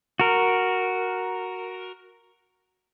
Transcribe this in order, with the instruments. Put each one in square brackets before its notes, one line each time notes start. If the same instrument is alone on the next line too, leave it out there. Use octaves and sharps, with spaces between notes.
[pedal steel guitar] F#4 A#4